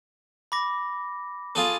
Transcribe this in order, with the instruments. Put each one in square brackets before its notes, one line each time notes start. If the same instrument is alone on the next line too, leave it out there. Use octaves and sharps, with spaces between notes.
[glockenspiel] B5 D6 A#6
[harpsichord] F4 G#4 A4